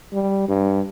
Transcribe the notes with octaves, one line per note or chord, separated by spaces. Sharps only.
G3
G2